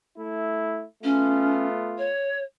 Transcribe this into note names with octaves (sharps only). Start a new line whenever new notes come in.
A3 E4
A3 B3 C#4 F4
C#5